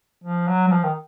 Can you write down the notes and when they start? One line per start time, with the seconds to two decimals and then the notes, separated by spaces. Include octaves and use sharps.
0.24 F3
0.48 F#3
0.68 F#3
0.72 F3
0.83 D#3